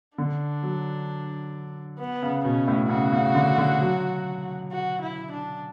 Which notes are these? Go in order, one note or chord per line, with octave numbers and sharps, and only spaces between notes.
D3 D4
F#3
B3
C#3
B2 C#4
A2
C#3 F#4
C#3
D3
D3
F#3
F#4
E4
D4